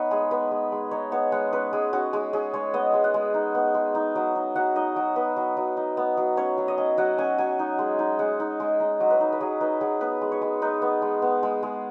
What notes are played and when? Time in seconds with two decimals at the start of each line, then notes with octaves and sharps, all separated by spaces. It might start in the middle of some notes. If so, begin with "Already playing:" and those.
Already playing: B3 D#4 B4 C#5
0.11 G#3 G#4
0.31 B3 B4
0.51 G#3
0.72 G#3
0.91 D#4 C#5
1.12 B3 C#5
1.32 G#3 F#5
1.53 C#4 B4
1.73 G#3 G#4
1.93 C#4 F#4
2.13 G#3 G#4
2.33 C#4 G#4
2.53 G#3 C#5
2.73 B3 D#5
2.93 G#3
3.04 F#5
3.14 G#3
3.34 D#4
3.55 B3
3.74 G#3
3.95 D#4
4.15 F#3
4.35 D#4
4.56 F#3 F#5
4.75 D#4 D#5
4.96 F#3
5.16 B3 B4
5.36 F#3
5.57 F#3
5.77 D#4
5.97 B3
6.17 F#3
6.37 C#4 C#5
6.58 F#3
6.68 D#5
6.78 C#4
6.97 F#3 F#5
7.18 C#4 G#5
7.38 F#3 G#5
7.59 D#4
7.79 G#3
7.99 D#4
8.19 G#3 F#5
8.40 D#4
8.60 G#3
8.80 D#4 D#5
9.00 F#3
9.10 B4
9.21 D#4
9.32 B4
9.41 F#3 G#4
9.61 D#4 B4
9.81 F#3 G#4
10.01 B3 B4
10.21 G#3
10.32 C#5
10.42 G#3
10.62 D#4 B4
10.82 B3
11.02 G#3
11.22 B3
11.43 G#3
11.63 G#3